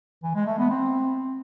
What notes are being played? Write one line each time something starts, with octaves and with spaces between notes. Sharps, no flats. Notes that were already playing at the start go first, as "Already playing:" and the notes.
E3
G#3
A3
B3
C4